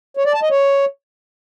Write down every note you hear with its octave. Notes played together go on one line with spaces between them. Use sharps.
C#5
D5
A5
D#5
C#5